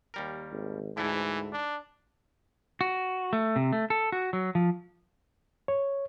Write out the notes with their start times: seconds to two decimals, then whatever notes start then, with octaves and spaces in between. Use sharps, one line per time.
0.14 D#2 G3 A#4
0.51 G#1
0.97 D2 G#2 E3 E4 A4
1.52 D4
2.81 F#4
3.33 A3
3.56 C3
3.73 A3
3.90 A4
4.12 F#4
4.33 F#3
4.55 F3
5.68 C#5